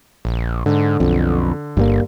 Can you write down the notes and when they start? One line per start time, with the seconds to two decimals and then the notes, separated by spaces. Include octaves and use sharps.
0.25 A#1
0.66 G#2 D3
1.00 B1 F2
1.77 G1 G2 G3 A#3